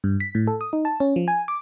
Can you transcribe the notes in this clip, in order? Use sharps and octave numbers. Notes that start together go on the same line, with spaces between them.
G2
B6
A2
A4
D#6
D#4
A5
C#4
F3
G#5
D6